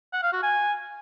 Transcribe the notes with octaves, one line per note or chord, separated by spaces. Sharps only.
F#5
F5
F#4
G#5